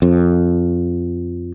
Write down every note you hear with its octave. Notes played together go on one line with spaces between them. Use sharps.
F2